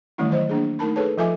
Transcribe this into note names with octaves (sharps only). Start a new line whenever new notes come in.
D#3 E3 G3 A3 C#4 E4
F#3 C5 D#5
A#3 D4 G#4
A3 D#4 A#4 A5 B5
G#4 A4 B4 C#5 A5
F3 F4 A4 E5 G#5 D6